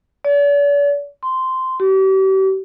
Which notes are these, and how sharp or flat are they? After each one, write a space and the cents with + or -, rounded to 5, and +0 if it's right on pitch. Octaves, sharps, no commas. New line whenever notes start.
D5 -45
C6 -10
G4 -40